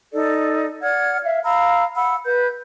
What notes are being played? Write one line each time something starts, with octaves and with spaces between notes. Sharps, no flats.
D#4 A4 D5
D5 F#5 F6 G#6
E5 F5
F5 A#5 B5 E6
F#5 B5 E6
B4 G6